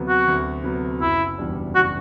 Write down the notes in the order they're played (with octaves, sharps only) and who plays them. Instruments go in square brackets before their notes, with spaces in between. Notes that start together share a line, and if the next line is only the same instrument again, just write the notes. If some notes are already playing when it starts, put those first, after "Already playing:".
Already playing: [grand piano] D2 C3 F#3 B3
[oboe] F#4
[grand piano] D2
C3 F#3 B3
[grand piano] F#1 [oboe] E4
[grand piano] E2 B2 G3 D4
[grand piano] F#1 [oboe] F#4